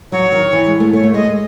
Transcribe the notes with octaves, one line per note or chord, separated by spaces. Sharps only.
F#3 C#5
D#3
E3
G#3
A3
A3 C#5
A3
G#3 D#5
G#3